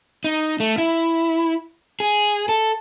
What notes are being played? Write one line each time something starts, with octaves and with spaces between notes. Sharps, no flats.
D#4
A3
E4
G#4
A4